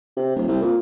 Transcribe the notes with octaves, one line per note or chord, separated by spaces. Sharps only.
C3
D#1
C2
A#2